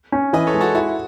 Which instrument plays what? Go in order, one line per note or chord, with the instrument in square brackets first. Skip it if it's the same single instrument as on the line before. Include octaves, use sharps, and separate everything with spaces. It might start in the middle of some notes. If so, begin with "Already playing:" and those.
[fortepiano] C#4
[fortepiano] E3 [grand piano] B4 D#5
[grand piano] A4 C#5
[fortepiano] G#3
[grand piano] F#4 A4
[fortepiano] E4 [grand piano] F#4